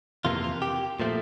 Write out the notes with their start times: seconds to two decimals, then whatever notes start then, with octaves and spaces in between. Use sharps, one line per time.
0.25 F2 C3 E3 A#3 F4
0.44 F4
0.62 G4
1.00 A#2 F3 A3 C4